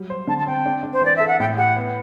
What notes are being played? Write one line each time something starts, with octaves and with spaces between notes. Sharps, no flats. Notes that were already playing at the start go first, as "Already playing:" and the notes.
Already playing: F#3 G3
C5
D3 A5
A5
C4 G5
D4
D4
C5
E3 D5
A4 E5
F#5
A2 G5
G4 F#5
B3